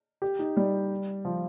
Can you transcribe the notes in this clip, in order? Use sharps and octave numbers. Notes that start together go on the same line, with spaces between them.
G4
D#4
G3
F3